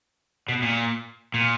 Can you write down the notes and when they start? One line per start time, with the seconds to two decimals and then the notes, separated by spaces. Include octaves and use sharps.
0.48 B2
0.62 A#2
1.34 A#2